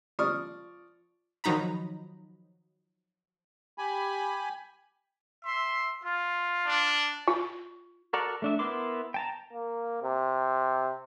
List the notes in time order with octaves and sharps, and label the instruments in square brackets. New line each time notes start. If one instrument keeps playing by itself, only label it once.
[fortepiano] F3 D5 C#6 D#6 F6
[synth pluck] D#3 F3 F#3 D#4 A#5 B5
[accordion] G4 G#5 B5
[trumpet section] E5 C6
F4
[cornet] D4
[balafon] F4
[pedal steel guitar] F#4 A4 A#4 D5 F#5
A3 D4 E5
B3 E4 A#4 C6 D6
G5 A5 A#5
[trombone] A#3
C3